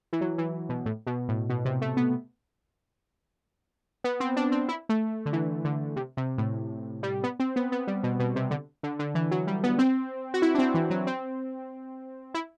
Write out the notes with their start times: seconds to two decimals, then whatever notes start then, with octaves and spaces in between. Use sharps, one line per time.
0.13 E3
0.21 F#3
0.38 E3
0.69 B2
0.86 A2
1.07 B2
1.28 A2
1.49 B2
1.65 C3
1.82 A3
1.97 B3
4.04 B3
4.20 C4
4.36 D4
4.52 C4
4.68 E4
4.89 A3
5.26 D3
5.33 E3
5.65 D3
5.96 C3
6.17 C3
6.38 A2
7.03 G3
7.24 B3
7.39 C4
7.56 B3
7.72 B3
7.87 G3
8.03 B2
8.20 B2
8.36 C3
8.51 D3
8.83 D3
8.99 D3
9.15 E3
9.31 F#3
9.47 G3
9.64 B3
9.79 C4
10.34 F#4
10.42 E4
10.54 D4
10.59 C4
10.74 E3
10.90 F#3
11.07 C4
12.34 E4